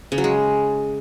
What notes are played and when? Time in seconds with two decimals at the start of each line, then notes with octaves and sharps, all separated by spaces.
0.12 C#3
0.18 F#3
0.24 G#3